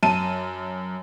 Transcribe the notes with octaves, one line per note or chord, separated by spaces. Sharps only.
F#2 A5 D#7